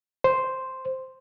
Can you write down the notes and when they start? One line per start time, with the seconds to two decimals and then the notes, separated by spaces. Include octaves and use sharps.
0.24 C5